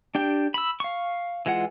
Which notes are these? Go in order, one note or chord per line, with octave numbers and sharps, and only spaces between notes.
D4 G4 G5
B5 E6
F5 C#6
E3 G#3 F4 F#5